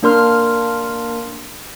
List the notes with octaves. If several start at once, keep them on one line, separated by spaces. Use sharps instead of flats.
A#3 D4 A#4 C6 F6